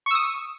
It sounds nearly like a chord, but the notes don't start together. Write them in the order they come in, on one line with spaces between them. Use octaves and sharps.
C#6 E6 D#6